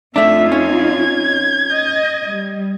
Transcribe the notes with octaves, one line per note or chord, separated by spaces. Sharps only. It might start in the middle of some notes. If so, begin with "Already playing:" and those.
F2 A3 D4 D#4 F4 E5
C#4 G#6
D#5
G3